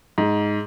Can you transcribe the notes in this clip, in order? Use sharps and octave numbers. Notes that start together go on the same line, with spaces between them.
G#2